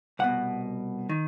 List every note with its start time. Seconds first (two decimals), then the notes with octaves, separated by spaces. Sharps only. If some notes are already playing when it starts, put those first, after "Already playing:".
0.19 C2 B2 F#5
1.09 D#3